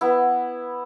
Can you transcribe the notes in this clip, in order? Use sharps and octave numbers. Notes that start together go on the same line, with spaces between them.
B3 E4